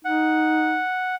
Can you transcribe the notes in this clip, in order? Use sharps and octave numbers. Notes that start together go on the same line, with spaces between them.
D#4 F#5